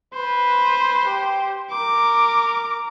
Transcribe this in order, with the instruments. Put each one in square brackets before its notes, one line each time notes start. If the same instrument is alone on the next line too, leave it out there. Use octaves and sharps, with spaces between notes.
[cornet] B4 [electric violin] C5
[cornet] G4
[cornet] A#4 [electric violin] D6